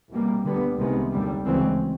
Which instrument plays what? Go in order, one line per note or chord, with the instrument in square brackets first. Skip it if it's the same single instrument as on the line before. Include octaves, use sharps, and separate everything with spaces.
[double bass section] C2 B2 G3 A#3
D2 D3 G3 B3
C2 C3 D#3 G#3 B3
D#2 D3 G3
D2 C#3 E3 G#3 C4